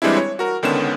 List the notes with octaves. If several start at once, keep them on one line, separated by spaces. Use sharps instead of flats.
E3 G3 G#3 C4 D4 E4
C#5
F#4 A#4
C#2 D3 D#3 B3 C#4 E7